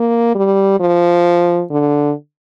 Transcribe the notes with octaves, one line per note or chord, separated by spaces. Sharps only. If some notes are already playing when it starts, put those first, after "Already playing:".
Already playing: A#3
G3
F3
D3